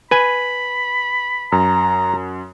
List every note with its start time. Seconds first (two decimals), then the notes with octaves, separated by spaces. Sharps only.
0.11 B4 G#5 B5
1.52 F#2 A#5